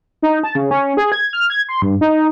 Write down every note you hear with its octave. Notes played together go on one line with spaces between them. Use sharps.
D#4
A5
C#3
C#4
G#4
G#6
F6
G#6
C6
G2
D#4